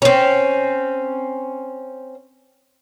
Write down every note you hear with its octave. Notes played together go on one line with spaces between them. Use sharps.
C4 C#4